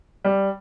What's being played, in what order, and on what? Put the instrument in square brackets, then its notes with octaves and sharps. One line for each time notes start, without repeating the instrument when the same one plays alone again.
[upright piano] G3